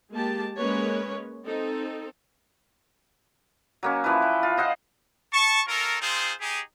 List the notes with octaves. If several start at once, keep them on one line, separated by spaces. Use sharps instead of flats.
G#3 A#3 G4 A5
G#3 A#3 C#4 B4 C#5
C4 D#4 A4
F#3 A#3 C#4
E3 F3 E4 B4
G5
F4
C5 D#5 F5 F#5
A5 C#6
C#4 F4 A4 A#4
C4 D#4 F4 G#4 C5
D#4 G4 G#4